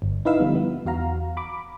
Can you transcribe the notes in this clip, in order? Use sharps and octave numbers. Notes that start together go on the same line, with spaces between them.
G1
D#4 E4 B4 E5 F5 E6
D3 F3 G3 B3 D#4
B3
E2 F#4 F5 A#5
B5 D6